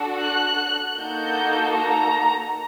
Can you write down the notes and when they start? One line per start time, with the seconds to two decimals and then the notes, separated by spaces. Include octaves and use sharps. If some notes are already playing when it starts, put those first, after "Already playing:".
Already playing: D4 F#4 A4
0.21 F#6
0.98 A#3 D#4 F#4 A4 G6
1.75 A#5